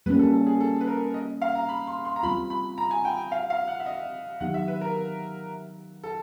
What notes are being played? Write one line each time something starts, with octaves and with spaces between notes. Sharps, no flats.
G3 A#3 C#4 B4
A4
A4
G#4
A4
B4
A#4
D#5
F5
A#5
B5
C6
C6
A#5
G3 C4 F4 B5
B5
A#5
G#5
G5
F5
F5
F#5
E5
D#5
D#3 F#3 B3 D#4 G4 F#5
E5
B4
A#4
A4